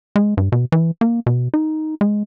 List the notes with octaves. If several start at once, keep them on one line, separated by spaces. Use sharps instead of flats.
G#3
G2
B2
E3
A#3
B2
D#4
G#3